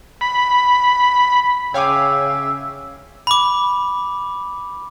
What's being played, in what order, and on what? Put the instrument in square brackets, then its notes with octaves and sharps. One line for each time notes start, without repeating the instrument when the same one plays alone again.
[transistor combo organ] B5
[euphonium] C#3 [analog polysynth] C#5 F5 G#5 [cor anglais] E5 [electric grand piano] G5 D6
[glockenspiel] B5 D6